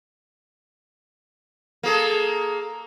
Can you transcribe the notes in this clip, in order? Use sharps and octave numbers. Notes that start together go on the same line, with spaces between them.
A#3 G#4 A4